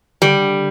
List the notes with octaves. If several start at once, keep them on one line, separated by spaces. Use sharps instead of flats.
D3 G3